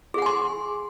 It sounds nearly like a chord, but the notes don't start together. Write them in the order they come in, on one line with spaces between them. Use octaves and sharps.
G#4 F#5 G#5 C6